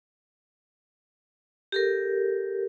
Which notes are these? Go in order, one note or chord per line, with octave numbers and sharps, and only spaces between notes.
G4 A4 A#4